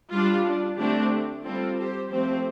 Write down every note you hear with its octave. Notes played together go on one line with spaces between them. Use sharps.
G3 D4 F4
D4
D3 A3 C4 D4 G4
G3 C4 F4 A4
G4 C5
F3 A3 C4 G4 C5